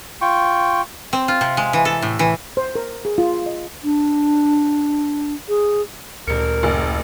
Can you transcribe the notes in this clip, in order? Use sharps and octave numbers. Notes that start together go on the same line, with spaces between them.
F4 G5 C#6
C4
F4
C3
G#3
E3
A4
A2
E3
C5
A#4
G#4
F4
D#5
D4
G#4
D#1 D2 A#4 C#7
F#1